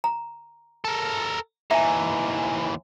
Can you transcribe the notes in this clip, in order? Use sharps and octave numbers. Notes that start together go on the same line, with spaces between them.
A#5
A4 A#4
D#2 E3 E5 G#5 A#5